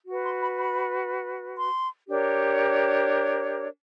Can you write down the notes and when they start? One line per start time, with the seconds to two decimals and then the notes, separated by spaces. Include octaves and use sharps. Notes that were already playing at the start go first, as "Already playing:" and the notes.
0.07 F#4 B4
0.23 C6
0.40 B5
0.57 B5
1.57 C6
2.07 D4 G4 A#4 C#5